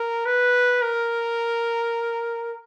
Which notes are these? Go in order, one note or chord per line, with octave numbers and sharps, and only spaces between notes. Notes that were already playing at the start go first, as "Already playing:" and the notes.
Already playing: A#4
B4
A#4